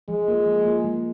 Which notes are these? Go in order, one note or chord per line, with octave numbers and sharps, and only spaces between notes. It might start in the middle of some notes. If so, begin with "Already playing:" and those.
F3 G#3
A#3 F4 A#4
F3
A#3 F4 A#4
G#3